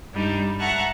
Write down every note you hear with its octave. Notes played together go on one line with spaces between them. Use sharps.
G2 G3 D4 D#4
E5 F#5 A5 A#5 C#6 F#6